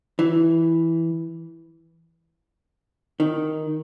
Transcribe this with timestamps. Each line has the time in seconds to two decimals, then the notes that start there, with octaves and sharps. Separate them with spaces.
0.19 E3
3.20 D#3